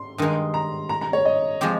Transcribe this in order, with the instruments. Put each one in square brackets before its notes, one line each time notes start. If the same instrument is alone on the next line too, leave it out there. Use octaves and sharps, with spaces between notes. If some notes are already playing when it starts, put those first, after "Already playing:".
Already playing: [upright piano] C6
[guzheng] G2 D#3 G#3 D#4
[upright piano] A#5
A#5
A#5
C#5
D#5
[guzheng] F3 G#3 C4 G4